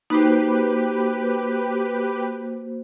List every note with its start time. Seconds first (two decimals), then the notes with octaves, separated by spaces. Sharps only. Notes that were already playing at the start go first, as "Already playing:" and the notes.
0.10 A#3 D#4 F#4 G4 B4 C5